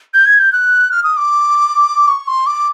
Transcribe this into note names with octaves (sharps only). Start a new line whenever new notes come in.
G6
G#6
G6
F#6
F6
D#6
D6
C#6
C6
D6